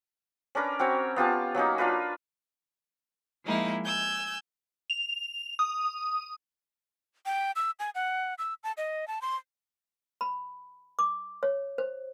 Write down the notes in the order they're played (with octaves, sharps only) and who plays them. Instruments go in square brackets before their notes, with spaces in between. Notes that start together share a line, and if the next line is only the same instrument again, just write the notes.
[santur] C#4 D4 A#4 B4
C4 C#4 F#4 C#5
B3 F4 G4 A5
F#3 A#3 C#4 D#4
D4 F4 A#4 B4
[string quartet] F3 G#3 A#3 D#4 E4
G#5 E6 G6
[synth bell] F7
D#6
[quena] G5
E6
G#5
F#5
E6
A5
D#5
A5
C6
[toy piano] B5
D6
C#5
C5